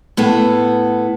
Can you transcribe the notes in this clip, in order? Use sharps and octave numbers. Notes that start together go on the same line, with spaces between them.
A2 B3 A4